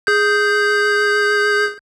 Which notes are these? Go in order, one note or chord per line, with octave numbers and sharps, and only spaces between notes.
G#4 G6